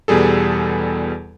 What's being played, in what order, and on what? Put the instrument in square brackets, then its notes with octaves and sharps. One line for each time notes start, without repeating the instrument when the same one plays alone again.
[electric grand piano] E2 B2 G3 G#4 A4